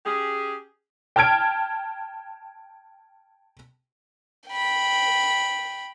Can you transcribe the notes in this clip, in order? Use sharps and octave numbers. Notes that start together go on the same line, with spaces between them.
C#4 G4 G#4
G5 A5 F6 G#6 D7
G5 B5